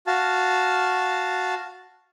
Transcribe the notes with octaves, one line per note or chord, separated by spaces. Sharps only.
F#4 F5 A5